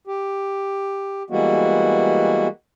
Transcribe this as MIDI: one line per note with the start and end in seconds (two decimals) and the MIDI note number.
0.07 1.23 67
1.30 2.48 52
1.30 2.48 55
1.30 2.48 56
1.30 2.48 58
1.30 2.48 59
1.30 2.48 66